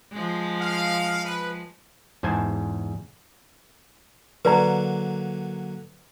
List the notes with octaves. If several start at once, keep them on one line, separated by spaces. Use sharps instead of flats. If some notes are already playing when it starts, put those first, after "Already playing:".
F3 G#3
F5
B4
E2 G#2 C5 G#5 A5
D3 F#3 A#3 B4 D5 A#5